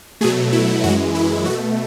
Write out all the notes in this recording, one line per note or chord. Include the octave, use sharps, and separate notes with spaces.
B2 F#3 A3 G#4
E4
F#2 E3 G#3 F#4
E4
B2 A3 F#4